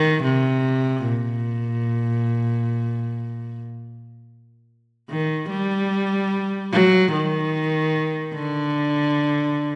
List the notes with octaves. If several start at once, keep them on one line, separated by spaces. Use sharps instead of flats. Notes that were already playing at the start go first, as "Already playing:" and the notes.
Already playing: D#3
C3
A#2
D#3
G3
F#3
D#3
D3